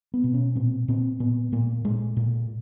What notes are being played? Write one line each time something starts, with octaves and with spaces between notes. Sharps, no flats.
B3
B2
C#4
A#2 C4
A#2 C4
A#2 B3
A#2 A#3
A#2 G#3
A#2